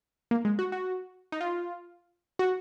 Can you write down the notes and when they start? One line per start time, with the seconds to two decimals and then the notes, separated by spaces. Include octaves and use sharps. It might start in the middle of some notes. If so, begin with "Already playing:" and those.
0.31 A#3
0.45 G#3
0.59 F#4
0.72 F#4
1.32 D#4
1.41 F4
2.39 F#4